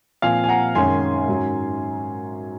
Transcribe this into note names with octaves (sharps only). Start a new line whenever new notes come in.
A#2 F3 C4 F5 G#5
G#5
F#5 A#5
F#2 D#3 G#3 C#4 G#5 C6
G#2 F#3 C#4